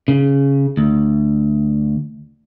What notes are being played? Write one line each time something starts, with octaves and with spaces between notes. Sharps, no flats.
C#3
D2